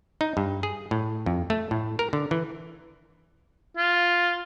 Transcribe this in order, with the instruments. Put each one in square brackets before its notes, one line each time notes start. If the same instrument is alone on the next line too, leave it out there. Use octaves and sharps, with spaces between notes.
[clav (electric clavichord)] D#4
G2
G#4
A2
F2
A3
A2
A#4
D3
E3
[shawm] F4